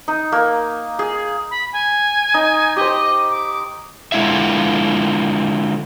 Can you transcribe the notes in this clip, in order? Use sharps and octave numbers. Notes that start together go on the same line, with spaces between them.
D#4
A#3
G#4
B5
G#5
D#4
G4 C5 D#5
D6
D3 G#3 E4 F4 E5